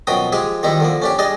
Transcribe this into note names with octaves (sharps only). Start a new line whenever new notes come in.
F#2 B2 F3 F#4 G5 D#6
F3 G#3 G4 G#4
D#3 F3 G3 D#4 E4
D3 F3 A#3
C#4 D4 G4
G3 D4 G#4 D#5